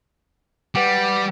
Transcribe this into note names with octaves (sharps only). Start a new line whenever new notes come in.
G3 B4 F#5 D6